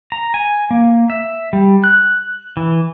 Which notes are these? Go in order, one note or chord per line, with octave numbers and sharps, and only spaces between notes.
A#5
G#5
A#3
E5
G3
F#6
E3